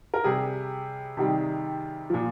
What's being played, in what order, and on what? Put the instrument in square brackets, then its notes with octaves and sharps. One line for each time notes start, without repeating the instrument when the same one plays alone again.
[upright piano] A#4
C3 G3 G#4
C3 D#3 G3
A#2 F3